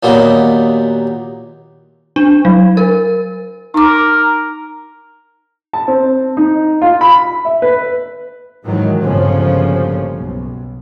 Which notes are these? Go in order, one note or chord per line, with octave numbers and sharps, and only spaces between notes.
D#2 A#2 F#3 B3 D#4
D4
F#3
A#4
D#4 A#4 D6
A5
C4
D#4
F4
B5
E5
B4
G#2 D#3 E3 F#3 G#3
G1 A#2 C#3 F3 A3 C#4
B1